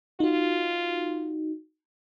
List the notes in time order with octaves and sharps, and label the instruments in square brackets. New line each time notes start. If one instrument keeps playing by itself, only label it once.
[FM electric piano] D#4 F#4 [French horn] F4